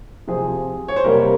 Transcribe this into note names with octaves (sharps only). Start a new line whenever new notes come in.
C3 F3 C4 G#4
C#5
C5
C3 G3 A#3 A#4